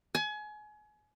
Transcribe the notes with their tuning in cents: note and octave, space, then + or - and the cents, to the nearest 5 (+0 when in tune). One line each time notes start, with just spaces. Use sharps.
G#5 +30